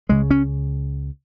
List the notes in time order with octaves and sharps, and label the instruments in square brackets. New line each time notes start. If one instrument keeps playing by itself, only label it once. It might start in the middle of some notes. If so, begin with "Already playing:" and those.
[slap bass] C#2 C#3 G#3
C#4